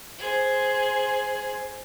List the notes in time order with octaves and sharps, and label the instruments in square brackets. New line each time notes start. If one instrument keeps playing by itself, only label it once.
[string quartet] G#4 C5